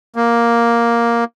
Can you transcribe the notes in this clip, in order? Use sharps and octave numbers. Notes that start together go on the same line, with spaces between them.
A#3